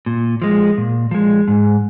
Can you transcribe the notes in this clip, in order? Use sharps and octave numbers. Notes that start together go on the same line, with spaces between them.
A#2
F3 G#3
A#2
F3 G#3
G#2